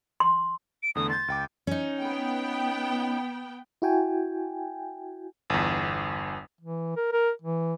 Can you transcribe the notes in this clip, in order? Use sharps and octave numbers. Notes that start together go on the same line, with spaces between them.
C6
D7
E2 D3 A3 D#6
C6 G6 A6
C#2 G5 D6
C#4 D#4
B3 G5
E4 F#4 G5 G#5
G1 E2
E3
A#4
A#4
E3